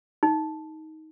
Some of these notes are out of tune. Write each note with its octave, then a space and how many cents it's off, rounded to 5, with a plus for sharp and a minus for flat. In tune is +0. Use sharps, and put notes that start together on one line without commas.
D#4 +15